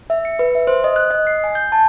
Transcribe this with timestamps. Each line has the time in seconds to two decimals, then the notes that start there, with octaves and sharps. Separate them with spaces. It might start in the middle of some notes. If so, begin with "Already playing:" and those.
0.10 E5
0.25 C#7
0.39 B4
0.55 E5
0.67 C5
0.84 D#5
0.96 F#6
1.11 D#5
1.27 C7
1.44 G#5
1.55 G6
1.72 A5